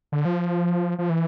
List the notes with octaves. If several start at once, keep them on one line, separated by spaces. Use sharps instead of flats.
D3
F3
F3
E3